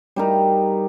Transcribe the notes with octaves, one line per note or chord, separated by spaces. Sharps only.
G3 D#4 A#4